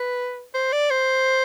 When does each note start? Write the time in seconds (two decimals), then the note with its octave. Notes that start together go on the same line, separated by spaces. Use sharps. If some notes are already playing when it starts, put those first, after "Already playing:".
Already playing: B4
0.54 C5
0.72 D5
0.90 C5